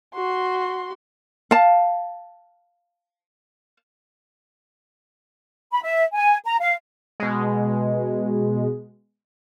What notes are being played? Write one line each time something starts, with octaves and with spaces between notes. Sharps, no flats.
F#4 C6
F5 A5
B5
E5
G#5
A#5
F5
B2 G#3